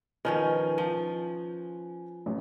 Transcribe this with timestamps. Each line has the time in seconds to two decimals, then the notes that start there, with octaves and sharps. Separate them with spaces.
0.25 D#3 F3 C#4 B4 G#5 F6
0.78 F3
2.26 A1